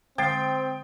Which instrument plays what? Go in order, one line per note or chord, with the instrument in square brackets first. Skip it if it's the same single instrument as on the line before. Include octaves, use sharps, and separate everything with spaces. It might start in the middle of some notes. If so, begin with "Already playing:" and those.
[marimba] D3 G#3 [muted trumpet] C4 [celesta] C5 A6 C7 [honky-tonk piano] G5 D#6